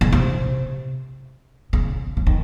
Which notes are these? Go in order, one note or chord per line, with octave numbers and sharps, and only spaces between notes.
C#3
C3
C#3
C#3
D#3